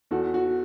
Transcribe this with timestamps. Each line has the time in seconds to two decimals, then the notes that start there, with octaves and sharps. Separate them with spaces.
0.11 E2 F#4 A4
0.34 F#4